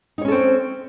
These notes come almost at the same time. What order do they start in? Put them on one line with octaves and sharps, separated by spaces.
D#4 C#5 C#4 A4 C4